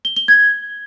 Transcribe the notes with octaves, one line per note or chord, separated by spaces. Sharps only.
G7
G7
G#6